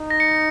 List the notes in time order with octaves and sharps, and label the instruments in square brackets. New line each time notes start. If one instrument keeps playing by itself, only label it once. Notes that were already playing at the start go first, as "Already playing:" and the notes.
Already playing: [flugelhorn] D#4
[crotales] A#6
C#7